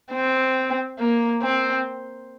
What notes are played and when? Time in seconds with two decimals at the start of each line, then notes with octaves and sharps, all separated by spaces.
0.12 C4
0.99 A#3
1.42 C4